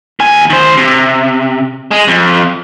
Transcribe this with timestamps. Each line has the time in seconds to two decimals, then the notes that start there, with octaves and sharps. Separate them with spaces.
0.20 D#2 G#5
0.50 D#3 C5
0.77 C3
1.91 G#3
2.08 F2